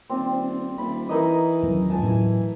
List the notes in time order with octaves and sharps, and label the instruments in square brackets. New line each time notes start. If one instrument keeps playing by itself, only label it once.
[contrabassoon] D#1 [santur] C4 D5
[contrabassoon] D#1 [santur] B5
[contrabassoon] E3 [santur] D#4 A#4 D#5
[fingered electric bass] D#2 F#3 C#4
[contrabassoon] C#2 [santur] G#5 A5
[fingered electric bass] A2 F#3 [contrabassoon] E3